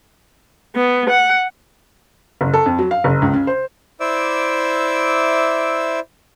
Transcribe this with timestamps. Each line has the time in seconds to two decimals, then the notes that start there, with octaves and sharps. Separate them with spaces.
0.76 B3
1.10 F#5
2.41 F#1
2.53 A4
2.66 F2
2.79 F#3
2.91 F5
3.04 F#1
3.22 C#2
3.34 C#3
3.47 C5
4.00 E4 C5 D5 E5 D6 E6